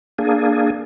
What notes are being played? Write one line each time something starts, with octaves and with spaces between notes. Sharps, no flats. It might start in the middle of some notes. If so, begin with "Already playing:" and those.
A#3 D4 G#4